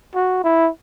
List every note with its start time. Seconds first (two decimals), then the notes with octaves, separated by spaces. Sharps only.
0.15 F#4
0.44 E4